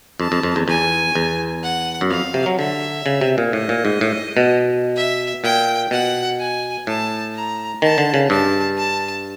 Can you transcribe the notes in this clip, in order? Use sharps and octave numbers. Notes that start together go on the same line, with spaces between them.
F2 A5
F2
F2
E2
E2 G#5
E2
F#5
F#2
F2 F5
C3
F#3
D3 E5
C#3
C3
A#2
A2 D#5
A#2
G#2
A2
B2
E5
A#2 G5
B2 F#5
G#5
A2 A5
A#5
D#3 A5
D3
C#3
G2 A5
A5